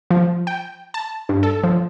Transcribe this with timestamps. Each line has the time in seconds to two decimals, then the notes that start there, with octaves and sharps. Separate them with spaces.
0.11 F3
0.47 G5
0.94 A5
1.29 G2
1.43 A4
1.64 F3